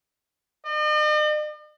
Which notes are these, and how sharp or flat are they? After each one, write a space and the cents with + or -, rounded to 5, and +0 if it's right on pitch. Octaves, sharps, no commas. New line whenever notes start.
D#5 -45